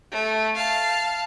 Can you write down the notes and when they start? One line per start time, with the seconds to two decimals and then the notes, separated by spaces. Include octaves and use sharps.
0.12 A3
0.56 F5 A5